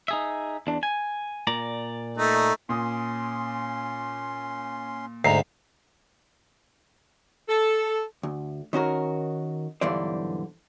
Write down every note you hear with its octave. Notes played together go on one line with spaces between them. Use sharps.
D#4 G#4 E5
E2 D4
G#5
A#2 D5 A#5
A3 D#4
A#2 C#4 C6 D#6
D2 G#2 A#5 C7
A4
D2
D#3 C#4 F#4 A#4
B1 G2 D3 E3 C5 D5